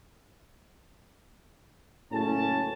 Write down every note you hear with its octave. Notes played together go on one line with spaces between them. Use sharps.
F#1 A2 C#4 A5